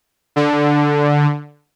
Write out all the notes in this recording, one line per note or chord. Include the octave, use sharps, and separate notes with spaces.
D3